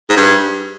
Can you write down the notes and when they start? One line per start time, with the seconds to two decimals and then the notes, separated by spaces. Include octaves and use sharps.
0.10 G#2
0.17 G2